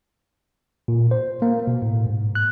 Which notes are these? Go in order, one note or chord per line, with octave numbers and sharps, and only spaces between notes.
A#2
C5
A#3
B2
A2
G#2
F#6